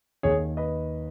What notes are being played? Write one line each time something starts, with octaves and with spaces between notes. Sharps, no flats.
D#2 D#3 G#4 C#5
B4 D#5